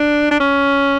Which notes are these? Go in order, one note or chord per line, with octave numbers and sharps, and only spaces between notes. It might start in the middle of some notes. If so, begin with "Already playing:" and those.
Already playing: D4
D4
C#4